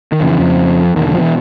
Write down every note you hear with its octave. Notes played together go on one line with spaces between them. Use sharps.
D#3
F2 C#3 E3
F2 F3
E2 B2 D#3
D3
F3
E3